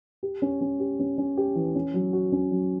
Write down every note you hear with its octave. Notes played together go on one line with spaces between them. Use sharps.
G4
C#4
C#4
G4
C#4
C#4
G4
E3
C#4
F#3
F#4
C#4
F#3